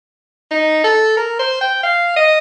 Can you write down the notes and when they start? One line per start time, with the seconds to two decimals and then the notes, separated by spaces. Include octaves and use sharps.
0.51 D#4
0.84 A4
1.17 A#4
1.39 C5
1.61 G5
1.83 F5
2.16 D#5